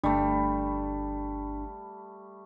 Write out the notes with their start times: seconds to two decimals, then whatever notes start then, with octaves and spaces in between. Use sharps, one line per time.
0.03 G1 G3 A3 D4